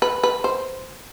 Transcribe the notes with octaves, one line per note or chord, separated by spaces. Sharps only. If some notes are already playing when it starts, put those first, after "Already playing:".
B4
B4
C5